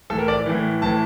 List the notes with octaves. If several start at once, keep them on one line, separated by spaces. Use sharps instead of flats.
A2 E3 A4
A#4
D5
A2 E3
A2 E3 A5